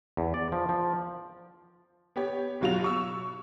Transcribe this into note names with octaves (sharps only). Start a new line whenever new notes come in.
E2
D5
F3
F3
B3 G4 C#5
G1 B2 F#3 F4 F#4 F7
C#6 E6